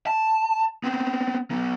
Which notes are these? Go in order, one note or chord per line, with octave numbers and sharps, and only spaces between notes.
A5
B3 C4
F#3 B3